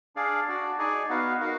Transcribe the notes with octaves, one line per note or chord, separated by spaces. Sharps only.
D4 G#4 D5 F5
D4 F#4 D5
D#4 G#4 D5 G#5
B3 D#4 F#4 B4 F5
D#4 F#4 A#4 F5